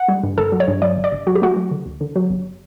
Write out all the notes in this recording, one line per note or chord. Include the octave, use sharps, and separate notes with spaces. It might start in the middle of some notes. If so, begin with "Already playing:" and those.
Already playing: F#5
G3
G2
G1 A4
F#3
C#5
G2
F#3 D5
G1
D5
G1
F#3 F#4
G4
A3 F#4
F#3
D3
D2
D3
F#3
G1